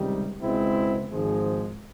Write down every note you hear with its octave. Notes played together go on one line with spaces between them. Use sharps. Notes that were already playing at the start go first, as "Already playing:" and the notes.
Already playing: C#2 C3 D#3 G3
C#2 B2 G#3 C4 E4
G#1 G#2 F3 G#3